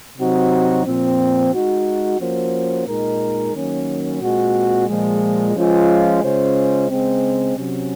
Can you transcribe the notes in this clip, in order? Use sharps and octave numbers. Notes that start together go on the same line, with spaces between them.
C3 F#3 C4 D#4 F#4
A#2 F3 C4
G#3 D#4 F#4
F3 A#3 C#4 F#4 C5
A#2 G#3 D#4 A#4
D#3 F#3 A#3 C#4
A#2 G#3 C4 F#4
A#2 F3 G#3
F3 G#3 C#4 F4
C#3 G#3 C#4 F4 C5
C#3 G#3 C4
C3 F#3 C#4